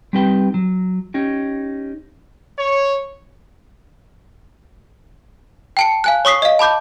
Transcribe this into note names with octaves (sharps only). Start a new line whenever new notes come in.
G3 C4 D#4 G4 B4 G5
F#3
C#4 D#4 G4
C#5
G5 A5 C#7
F5 G#5 F#6
C#5 C#6 D#6 B6 C7
D#5 F5
A5 B5 D6 G6